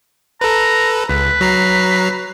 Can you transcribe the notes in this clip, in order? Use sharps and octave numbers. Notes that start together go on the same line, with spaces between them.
A4 B4 A#5
C#2 B4
F#3 A#5 C7